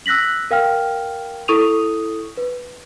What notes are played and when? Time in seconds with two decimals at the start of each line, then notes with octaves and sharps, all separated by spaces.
0.06 E6 F#6 A#6 B6 F#7
0.51 A#4 F5 G5 F6
1.48 E4 A4 C#6 D#6 D#7 F7
2.37 B4